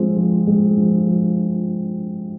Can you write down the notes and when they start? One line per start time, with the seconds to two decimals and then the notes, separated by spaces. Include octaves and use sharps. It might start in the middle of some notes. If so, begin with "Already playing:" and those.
Already playing: F3 G#3 C4
0.16 F3
0.47 G#3
0.77 F3
1.07 F3